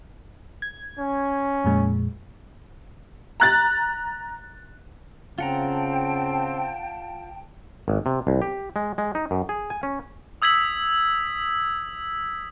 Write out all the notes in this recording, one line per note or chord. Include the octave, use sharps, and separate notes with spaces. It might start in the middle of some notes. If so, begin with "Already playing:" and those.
G#6
C#4
F2 A#2 G#3
A#5 F#6 A6
C#3 C4 F4 F#5 G5 A5 A#5
G#1
C3
C2
G4
G#3
G#3
D#4
F#2
G#4
G#5
C#4
D#6 E6 G#6 B6 F#7